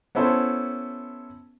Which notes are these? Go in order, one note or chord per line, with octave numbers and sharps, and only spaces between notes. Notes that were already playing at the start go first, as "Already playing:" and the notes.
B3 C#4 E4 A4 C5